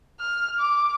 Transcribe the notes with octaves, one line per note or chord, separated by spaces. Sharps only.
F6
D6